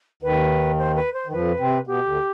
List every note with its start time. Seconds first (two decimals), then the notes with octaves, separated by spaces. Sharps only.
0.22 D#2 D#3 B4
0.78 C5
0.95 B4
1.13 C5
1.27 D#3
1.32 F2 F3 B4
1.59 C3 C4
1.87 B2 B3 G4
2.05 D2 D3